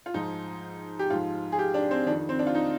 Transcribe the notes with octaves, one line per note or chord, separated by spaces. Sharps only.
F4
G#2 F3 D#4
G4
G#2 F3 F4
G#4
G4
D4
C4
F2 D#3 D4
C4
D4
F4
D#4